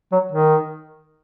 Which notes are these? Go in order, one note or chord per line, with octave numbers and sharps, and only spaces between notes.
F#3
D#3